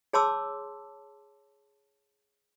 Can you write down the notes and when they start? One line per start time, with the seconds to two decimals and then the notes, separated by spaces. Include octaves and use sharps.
0.13 G#4 C#5 A5 C6 D6 E6